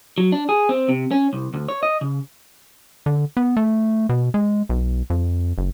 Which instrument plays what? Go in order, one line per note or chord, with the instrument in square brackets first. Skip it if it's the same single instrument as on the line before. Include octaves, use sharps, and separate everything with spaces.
[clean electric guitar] F#3
D4
G#4
C4
C3
C#4
C2
D2
C#5
D#5
C#3
[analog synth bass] D3
B3
A3
B2
G#3
B1
F2
F#1